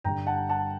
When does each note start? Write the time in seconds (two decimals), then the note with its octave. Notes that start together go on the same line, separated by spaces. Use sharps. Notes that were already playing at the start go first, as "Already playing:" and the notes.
0.04 G1 G2 D3 G5 A#5
0.27 F#5 A5
0.49 F#5 A5